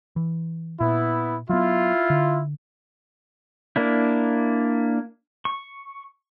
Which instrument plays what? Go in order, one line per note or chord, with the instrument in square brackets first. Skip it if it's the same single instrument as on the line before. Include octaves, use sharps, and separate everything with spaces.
[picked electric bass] E3
[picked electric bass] A#2 [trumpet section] B3 E4
[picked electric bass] F#3 B3 [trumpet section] E4 F4
[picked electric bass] D3
[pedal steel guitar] A#3 D4 E4
C#6